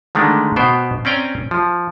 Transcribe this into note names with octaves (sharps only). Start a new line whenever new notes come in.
D3 D#3 G#3 A3 D4
B2 B3 C5 G5
C4 C#4 D5 G5 G#5 A#5
F3